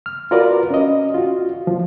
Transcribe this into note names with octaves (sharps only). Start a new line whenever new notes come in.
F6
F4 F#4 A#4 B4 D5
C#4 D#5
F4 F#4
F3